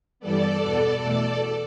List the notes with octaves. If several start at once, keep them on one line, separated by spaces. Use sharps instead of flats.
G2 E3 G3 B3 A4 D5
E2 B2 B3
E2 B2 A3 A4 D5